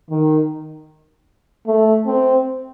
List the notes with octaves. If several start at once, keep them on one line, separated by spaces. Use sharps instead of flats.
D#3
A3
C4